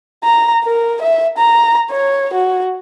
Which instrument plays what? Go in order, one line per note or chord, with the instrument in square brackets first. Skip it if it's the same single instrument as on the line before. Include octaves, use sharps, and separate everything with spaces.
[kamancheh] A#5
A#4
E5
A#5
C#5
F#4